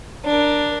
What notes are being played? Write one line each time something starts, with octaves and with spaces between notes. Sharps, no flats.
D4 A#4